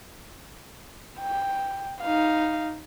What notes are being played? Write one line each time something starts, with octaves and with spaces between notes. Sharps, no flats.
G5
D#4 F5